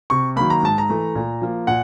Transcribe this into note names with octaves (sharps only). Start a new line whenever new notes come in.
C3 C#6
D#3 F#3 A#3 B5
A#5
G#2 A5
A#5
E3 A3
A#2
F3 A#3
A#2 F#5